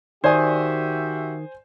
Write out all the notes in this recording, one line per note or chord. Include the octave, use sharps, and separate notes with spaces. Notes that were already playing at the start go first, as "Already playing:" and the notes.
D#3 F#4 G4 C5 D5 E5 G#5